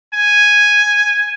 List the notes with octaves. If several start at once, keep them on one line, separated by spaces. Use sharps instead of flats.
G#5